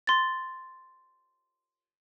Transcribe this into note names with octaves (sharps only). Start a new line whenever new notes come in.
C6 A6